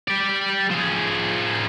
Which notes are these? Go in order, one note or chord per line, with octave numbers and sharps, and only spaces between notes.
G4 D5
F3 G#4